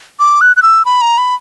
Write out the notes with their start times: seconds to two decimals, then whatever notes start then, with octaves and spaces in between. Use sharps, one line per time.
0.20 D6
0.41 F#6
0.56 F#6
0.62 E6
0.85 B5
1.01 A#5
1.18 B5